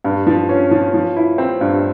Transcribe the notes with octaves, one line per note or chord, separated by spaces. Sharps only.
G2
F3
C#4
F3
F3
E4
C4
G2